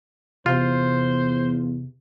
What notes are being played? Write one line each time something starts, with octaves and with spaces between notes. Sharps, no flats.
E2 C3 F4 C5